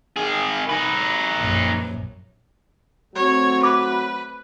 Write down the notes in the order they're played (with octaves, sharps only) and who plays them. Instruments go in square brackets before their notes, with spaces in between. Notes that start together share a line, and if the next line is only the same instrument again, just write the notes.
[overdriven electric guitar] D#3 G#4
D#4 B4
[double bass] A#1 F#2
[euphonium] F#3 [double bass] A3 C4 [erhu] C#5
[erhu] B4 [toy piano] D6